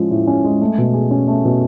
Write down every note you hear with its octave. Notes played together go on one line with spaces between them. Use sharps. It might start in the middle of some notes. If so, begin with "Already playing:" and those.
Already playing: A2 F3 G#3 C#4
A2
C#4
G#3
A3
B2
G#4
C#4
A3
B2